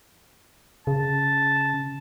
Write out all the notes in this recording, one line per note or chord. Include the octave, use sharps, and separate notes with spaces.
C#3 A5